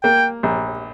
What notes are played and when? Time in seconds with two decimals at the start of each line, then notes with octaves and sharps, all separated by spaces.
0.03 A#3 G5
0.43 A#1